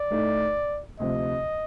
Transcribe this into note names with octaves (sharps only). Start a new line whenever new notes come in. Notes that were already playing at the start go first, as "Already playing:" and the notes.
Already playing: D5
A2 A3 D#4
D2 C3 F3 D#5